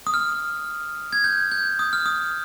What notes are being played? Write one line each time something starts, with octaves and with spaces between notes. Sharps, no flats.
D#6
F6
G#6
G6
G6
D#6
F6
D#6